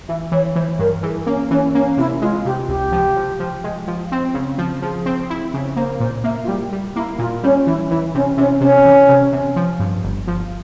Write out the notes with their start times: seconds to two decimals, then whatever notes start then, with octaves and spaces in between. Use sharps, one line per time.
0.08 E3 E5
0.32 E3 C#5
0.56 E3 C5
0.79 G2 A#4
1.03 E3 G#4
1.26 A#3 C#4
1.51 E3 C#4
1.74 A#3 C#4
1.97 C3 E4
2.21 G#3 F4
2.45 C3 G4
2.68 C#2 G4
2.92 F3
3.16 F3
3.40 F3
3.64 G#3
3.87 F3
4.12 C4
4.34 C#3
4.58 F3
4.82 F3 G#4
5.06 C4
5.30 E4
5.54 C#3
5.77 A#3 C5
6.00 A#2 C5
6.24 A#3 E5
6.44 F4
6.48 G3 G4
6.72 G3
6.95 A#3 E4
7.19 A#2 F4
7.43 G3 C#4
7.66 E3 E4
7.91 E3 E4
8.14 C3 C#4
8.37 C3 C#4
8.61 C3 C#4
8.85 E3
9.09 C3
9.33 C3
9.56 F3
9.80 G2
10.03 G1
10.27 F3